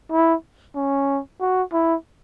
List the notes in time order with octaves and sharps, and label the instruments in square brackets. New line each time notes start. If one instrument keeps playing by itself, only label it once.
[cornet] E4
C#4
F#4
E4